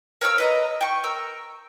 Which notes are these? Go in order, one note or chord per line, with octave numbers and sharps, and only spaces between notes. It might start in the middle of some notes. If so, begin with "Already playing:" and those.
A#4 C#5 F5 E6
B4 D#5 A#5
G5 C#6
A#4 E6